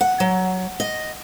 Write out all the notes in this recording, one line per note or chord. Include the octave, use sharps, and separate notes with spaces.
F#5
F#3
D#5